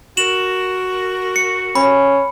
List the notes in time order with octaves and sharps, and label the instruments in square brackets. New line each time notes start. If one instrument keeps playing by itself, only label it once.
[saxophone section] F#4 A#4 [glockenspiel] E7 F#7
[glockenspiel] C#7
[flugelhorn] C#4 [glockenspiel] B5